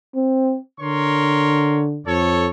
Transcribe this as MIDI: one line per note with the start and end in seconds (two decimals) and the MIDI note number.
0.15 0.57 60
0.80 2.00 50
0.80 1.85 70
0.80 1.85 73
0.80 1.85 84
2.07 2.49 41
2.07 2.51 69
2.07 2.51 73